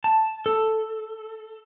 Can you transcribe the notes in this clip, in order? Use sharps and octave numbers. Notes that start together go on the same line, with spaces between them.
A5
A4